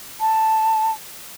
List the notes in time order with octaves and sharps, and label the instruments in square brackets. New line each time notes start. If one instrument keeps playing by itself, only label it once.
[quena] A5